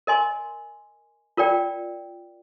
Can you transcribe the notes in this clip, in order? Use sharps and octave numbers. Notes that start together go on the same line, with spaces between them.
A#4 D#5 G#5 C6
F4 A#4 D5 G5